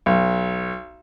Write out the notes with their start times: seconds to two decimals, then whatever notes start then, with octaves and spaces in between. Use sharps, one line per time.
0.06 B1